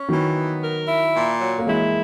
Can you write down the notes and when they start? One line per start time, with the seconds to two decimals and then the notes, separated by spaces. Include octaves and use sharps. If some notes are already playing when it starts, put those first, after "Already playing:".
Already playing: C#4
0.09 D#3 E3 F#3
0.35 B3
0.62 A#4
0.88 E4
1.14 A#2
1.41 F#3
1.58 A#3
1.67 E3 G#3 E4